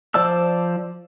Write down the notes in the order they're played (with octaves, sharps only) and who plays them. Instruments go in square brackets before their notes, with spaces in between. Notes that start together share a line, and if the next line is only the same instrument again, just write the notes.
[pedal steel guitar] F3 C5 D5 A5 E6